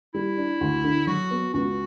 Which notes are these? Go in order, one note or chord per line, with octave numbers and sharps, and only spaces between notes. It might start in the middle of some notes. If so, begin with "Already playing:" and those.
G3 E4
D4
D2
D3
F#3 F#4
B3
C#2 F#4